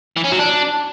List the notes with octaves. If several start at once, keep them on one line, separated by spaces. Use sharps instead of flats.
E3
C#4
F#3
D4